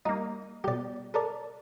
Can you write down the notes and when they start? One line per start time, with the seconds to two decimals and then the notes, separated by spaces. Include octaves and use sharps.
0.06 G3 A#3 D#4
0.64 B2 G3 G4 D5
1.14 A4 A#4 D5